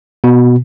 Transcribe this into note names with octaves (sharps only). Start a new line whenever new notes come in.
B2